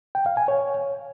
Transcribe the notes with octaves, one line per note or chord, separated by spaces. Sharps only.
G5
F5
G#5
C#5